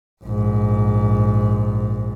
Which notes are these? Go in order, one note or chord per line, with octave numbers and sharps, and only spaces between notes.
A#1 G#2